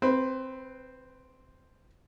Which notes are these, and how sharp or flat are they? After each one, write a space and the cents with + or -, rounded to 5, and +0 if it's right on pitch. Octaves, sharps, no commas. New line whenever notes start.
C4 +0 B4 +25 B5 +0